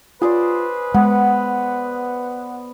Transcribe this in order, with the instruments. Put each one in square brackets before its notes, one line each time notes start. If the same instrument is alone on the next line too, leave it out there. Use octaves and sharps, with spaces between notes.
[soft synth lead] F4 [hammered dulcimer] G#4 C5 D5 [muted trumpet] B4
[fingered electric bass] G#3 [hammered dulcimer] B3 [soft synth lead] F#5